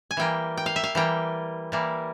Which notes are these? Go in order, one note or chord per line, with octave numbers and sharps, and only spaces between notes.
G#5
E3 G3 A#3 G5
G5
F5
E5
F5
E3 G3 A#3 G5
E3 G3 A#3